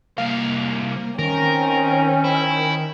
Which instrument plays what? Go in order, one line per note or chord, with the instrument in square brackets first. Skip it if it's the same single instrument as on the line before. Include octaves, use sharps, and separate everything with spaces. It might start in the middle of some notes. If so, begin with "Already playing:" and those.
[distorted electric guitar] C2 F5 [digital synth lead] A#3
[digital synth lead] D#3 [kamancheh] C4 C#4 [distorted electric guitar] A#4
[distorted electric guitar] E4